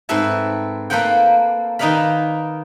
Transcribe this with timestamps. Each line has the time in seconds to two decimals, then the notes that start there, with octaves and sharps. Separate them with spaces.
0.09 G#2 C4 A4 B4 E5 A5
0.90 A#3 A4 B4 C5 F#5 G5
1.79 D#3 D#4 B4 D5 F5 B5